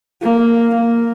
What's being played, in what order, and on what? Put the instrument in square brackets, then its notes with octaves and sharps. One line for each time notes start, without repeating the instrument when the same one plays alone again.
[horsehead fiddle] A#3
A#3